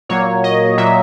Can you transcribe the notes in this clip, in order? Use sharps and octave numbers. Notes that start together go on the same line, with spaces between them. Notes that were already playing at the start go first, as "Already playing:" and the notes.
A#2 F#3 A#3 C#5
D#5
A#2 F#3 A#3 E5